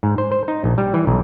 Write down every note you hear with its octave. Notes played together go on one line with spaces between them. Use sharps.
G#2
C5
C5
D#4
A#1
G3
E3
B1